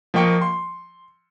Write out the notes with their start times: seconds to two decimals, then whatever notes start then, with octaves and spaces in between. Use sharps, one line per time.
0.14 F3 A#3 D#5 G5 C#6 C#7
0.42 C6